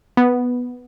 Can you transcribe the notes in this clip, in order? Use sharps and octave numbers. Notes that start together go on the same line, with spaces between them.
B3